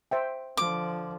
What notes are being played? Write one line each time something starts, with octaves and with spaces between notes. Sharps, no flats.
C5 E5 G5
D3 F3 D6